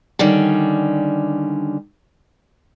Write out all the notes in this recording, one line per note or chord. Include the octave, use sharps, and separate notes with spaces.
D3 D#3 G3 C#4